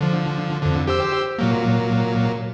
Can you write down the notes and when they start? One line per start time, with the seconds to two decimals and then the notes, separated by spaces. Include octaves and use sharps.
0.01 D3 F3
0.62 F2 D3
0.88 G4 C5 E6
1.38 A#2 F#3 A#3